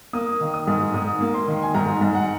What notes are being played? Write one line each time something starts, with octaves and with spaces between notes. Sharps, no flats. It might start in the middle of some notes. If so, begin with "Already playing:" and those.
A#3 D#6
D#3
D#6
G#2
G#2 D#6
A#3
C6
D#3
G#5
G#2 A#5
G#2
F#5